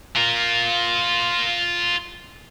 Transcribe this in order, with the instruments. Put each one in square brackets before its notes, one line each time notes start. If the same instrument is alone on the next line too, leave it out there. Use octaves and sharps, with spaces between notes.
[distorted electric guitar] F4 A#4